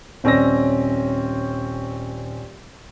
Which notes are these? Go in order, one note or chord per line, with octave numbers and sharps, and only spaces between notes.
D#1 C4 C#4 D5 E6 A#6